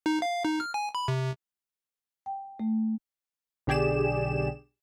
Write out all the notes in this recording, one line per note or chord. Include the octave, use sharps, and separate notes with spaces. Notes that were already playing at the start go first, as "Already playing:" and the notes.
D#4
F5
D#4
F6
G#5
B5
C3
G5
A3
B1 D3 G4 G#4 D5 E7